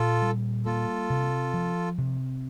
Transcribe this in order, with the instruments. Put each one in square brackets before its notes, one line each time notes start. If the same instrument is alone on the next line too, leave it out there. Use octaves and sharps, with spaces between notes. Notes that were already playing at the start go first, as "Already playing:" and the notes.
Already playing: [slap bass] A#2 C4 [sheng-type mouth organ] F4 A4
[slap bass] G3
[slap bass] A#3 [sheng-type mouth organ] F4 A4
[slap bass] C3
F3
C3